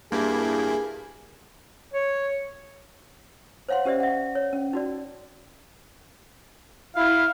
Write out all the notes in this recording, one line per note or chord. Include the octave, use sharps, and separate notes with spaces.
G2 A#3 E4 G#4
C#5
C5 C#5 F5 F#5 C6
C#4 G4 C5 D5 E5
E5 F#5
C#5
C#4
D#4 F#4 D5
E4 F5